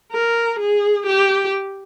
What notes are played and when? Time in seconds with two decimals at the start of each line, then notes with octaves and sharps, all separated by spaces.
0.13 A#4
0.60 G#4
1.06 G4